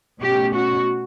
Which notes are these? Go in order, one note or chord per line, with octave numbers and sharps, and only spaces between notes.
B2 A3 C#4 G4
F#4